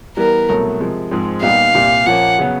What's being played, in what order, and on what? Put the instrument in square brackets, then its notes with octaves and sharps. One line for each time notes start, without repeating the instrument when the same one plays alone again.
[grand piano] E3 G3 B3 [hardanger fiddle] A#4
[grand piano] C2 B2 F#3 A3
C3 F3 G#3
G#2 F3 G#3 C4
[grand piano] A#2 G3 B3 D#4 G4 [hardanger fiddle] F5
[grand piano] C2 A#2 G3
[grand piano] A#2 F3 A#3 C#4 [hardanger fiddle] F#5
[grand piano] C#3 F#3 B3